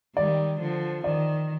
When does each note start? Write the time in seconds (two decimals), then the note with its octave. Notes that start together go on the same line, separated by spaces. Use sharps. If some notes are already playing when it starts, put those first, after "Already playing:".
0.16 D#3 G3 D5
0.60 D3 F3
1.04 D#3 D5